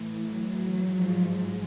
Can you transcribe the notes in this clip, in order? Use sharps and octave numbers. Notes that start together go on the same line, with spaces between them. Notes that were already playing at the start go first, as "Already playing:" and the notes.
Already playing: A2 E3
F#3
G#2 F3